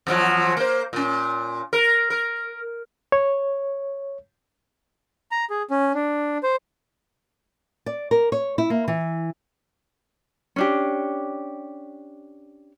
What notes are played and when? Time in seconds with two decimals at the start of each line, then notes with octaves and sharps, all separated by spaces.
0.07 E2 F3 F#3
0.57 A#3 C5
0.93 A#2 C#4
1.73 A#4
2.10 A#4
3.12 C#5
5.31 A#5
5.50 G#4
5.70 C#4
5.94 D4
6.43 C5
7.86 D5
8.11 A#4
8.32 C#5
8.58 E4
8.70 A#3
8.88 E3
10.56 C#4 D4 G4